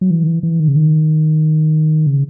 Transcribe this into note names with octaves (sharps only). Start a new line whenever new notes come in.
F#3
E3
D#3
E3
E3
D#3
C#3
D#3
C#3